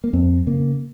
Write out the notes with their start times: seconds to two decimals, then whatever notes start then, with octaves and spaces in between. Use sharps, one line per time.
0.04 A#3
0.13 F2 C4
0.47 C#3 A#3